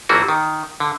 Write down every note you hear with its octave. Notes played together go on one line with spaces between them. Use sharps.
G1 E3 A3 A#3 F#4
D#3
D3